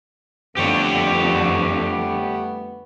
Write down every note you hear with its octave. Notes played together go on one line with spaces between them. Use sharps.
F2 D3 G3 A3 B3 G4 C#5